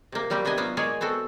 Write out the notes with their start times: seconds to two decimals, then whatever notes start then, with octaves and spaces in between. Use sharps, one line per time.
0.12 C3 A#3
0.30 F#3 G3 A#3 C4 G4
0.45 C3 B3 D4 D#5 G#5
0.58 F#3 B3 F4
0.77 G#3 A#3 G#4 C#5 D5 G#5
1.01 B3 C4 F#4 A4